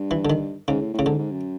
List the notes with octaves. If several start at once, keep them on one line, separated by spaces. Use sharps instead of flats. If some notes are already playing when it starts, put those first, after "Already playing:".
Already playing: G2
E3
D3
D#3
G#2 C#3
A2
A2
C#3
G#2 D3
G#2
F#2